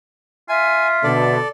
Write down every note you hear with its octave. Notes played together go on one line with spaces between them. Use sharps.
F4 E5 G#5
B2 D3 A4 D5